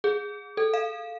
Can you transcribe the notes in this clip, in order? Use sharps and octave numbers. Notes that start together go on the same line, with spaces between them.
G#4
A4
F5